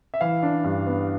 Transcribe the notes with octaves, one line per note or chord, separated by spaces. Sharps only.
E5
E3 F5
D4
G2
B3